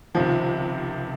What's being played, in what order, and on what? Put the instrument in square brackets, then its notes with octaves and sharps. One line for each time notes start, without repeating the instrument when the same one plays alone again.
[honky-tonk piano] C#2 C3 D#3 [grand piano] F3